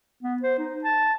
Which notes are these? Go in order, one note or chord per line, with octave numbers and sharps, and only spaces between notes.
B3
C5
D#4
A5